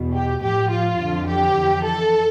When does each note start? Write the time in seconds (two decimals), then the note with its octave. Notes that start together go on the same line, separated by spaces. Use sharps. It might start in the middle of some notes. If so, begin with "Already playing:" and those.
Already playing: E2 B2
0.14 G4
0.42 A2 F3 G4
0.71 F4
0.99 F2 D3 F3
1.27 G4
1.56 F2 E3
1.84 A4